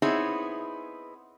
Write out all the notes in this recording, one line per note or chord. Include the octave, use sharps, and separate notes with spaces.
B3 C4 D#4 E4 G#4 C#5